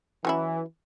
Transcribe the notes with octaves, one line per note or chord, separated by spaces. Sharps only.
E3 F#3 C#4 E4